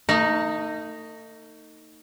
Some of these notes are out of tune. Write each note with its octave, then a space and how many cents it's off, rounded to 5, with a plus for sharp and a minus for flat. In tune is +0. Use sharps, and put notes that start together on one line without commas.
A3 +45 D#4 +0